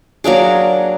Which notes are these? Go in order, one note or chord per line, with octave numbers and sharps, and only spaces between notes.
F#3 A#3 D4 G#4